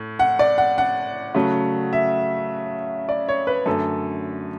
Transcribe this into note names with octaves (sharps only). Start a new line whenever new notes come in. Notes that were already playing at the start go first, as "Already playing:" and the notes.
Already playing: A2
F#5
D5
F#5
F#5
C#3 F#3 A3
E5
D5
C#5
B4
F#2 D3 A3 A4